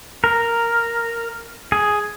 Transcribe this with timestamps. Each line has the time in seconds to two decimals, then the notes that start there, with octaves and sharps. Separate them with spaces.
0.24 A#4
1.72 G#4